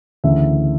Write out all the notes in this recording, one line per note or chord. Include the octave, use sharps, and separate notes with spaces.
D2 C#3 E3 E5